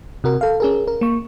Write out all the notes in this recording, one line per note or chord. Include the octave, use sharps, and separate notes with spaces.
C3 F#4 A#4
A4 F5
C#4 G#4 A#4
A#4
A#3 C#6